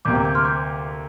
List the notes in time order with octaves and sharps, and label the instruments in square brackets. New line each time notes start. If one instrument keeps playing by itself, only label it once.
[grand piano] D2 C3 A#3 G4 [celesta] D6 G6
[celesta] A#5 D6
D6 G6
C6 F6
D6 G6